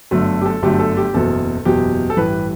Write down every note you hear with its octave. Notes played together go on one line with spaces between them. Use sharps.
G1 F#2 D3 F#3 A3
G4
A4
G1 F#2 D3 F#3 A3 G4
A4
G4
F#1 E2 B2 F#3 A4
F#1 E2 B2 F#3 G4
A4
A1 G2 E3 B4